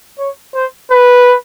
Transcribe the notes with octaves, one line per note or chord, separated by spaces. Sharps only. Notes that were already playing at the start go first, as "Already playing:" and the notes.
C#5
C5
B4